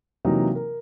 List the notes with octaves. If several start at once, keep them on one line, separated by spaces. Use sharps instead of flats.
C3 E3 F#3 A#3 D#4
A#4